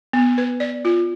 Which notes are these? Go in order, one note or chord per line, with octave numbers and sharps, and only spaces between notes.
B3
B4
D5
F4